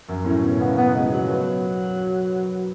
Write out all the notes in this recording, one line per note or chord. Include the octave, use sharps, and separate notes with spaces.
F#2
A2 C#4
B2
C#3 B3
B3
G#3
F3
F#3
B3